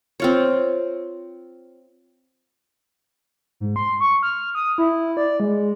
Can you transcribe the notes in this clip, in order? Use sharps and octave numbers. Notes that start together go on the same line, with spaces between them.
C4 F4 C#5
G#2
C6
C#6
F6
D#6
E4
D5
G#3